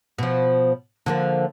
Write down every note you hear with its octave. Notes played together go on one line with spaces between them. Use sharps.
B2 F3
D3 F3 A#3